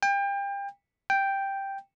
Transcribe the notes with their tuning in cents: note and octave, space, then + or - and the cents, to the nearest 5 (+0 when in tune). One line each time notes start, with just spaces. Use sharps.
G5 +30
G5 +0